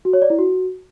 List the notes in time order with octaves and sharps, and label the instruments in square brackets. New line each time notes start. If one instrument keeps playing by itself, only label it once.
[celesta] F#4
C#5
D5
E4
F#4